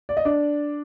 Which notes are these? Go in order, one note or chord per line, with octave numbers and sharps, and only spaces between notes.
D5
D#5
D4 D5